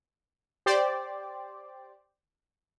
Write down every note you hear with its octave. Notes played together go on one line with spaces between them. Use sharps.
G4 C5 D5